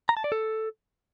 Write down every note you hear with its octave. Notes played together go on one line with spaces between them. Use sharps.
A#5
A5
D5
A4